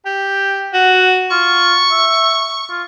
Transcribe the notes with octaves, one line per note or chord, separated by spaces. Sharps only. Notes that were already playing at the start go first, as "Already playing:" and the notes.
G4 G5
F#4 F#5
F4 C#6
E5
F4